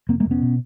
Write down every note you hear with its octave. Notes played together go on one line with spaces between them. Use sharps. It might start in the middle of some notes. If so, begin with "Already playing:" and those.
F1 A#3 C4
G#3 A#3
F1
B3 C#4
B2